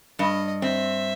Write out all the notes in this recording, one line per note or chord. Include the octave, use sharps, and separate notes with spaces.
G2 D#5
C4 E5